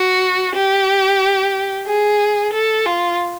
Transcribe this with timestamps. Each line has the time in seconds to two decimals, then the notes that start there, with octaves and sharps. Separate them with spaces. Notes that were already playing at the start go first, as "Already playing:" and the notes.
Already playing: F#4
0.55 G4
1.87 G#4
2.53 A4
2.85 F4